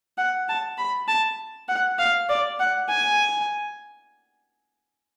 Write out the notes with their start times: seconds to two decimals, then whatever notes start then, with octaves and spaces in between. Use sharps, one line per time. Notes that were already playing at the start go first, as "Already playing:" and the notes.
0.18 F#5
0.48 A5
0.78 B5
1.08 A5
1.68 F#5
1.98 F5
2.29 D5
2.59 F#5
2.89 G#5